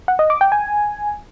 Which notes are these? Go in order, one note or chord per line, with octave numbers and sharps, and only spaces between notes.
F#5
D#5
D6
G5
G#5